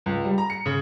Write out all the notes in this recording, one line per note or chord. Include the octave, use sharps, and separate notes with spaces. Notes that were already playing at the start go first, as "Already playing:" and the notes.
C#2
G3
A#5
C#7
C#3